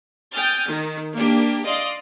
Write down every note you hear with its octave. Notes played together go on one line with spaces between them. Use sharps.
G5 G#5 D#6 F6 G6 A6
D#3
A#3 D4 G4
D5 D#5 F5 C6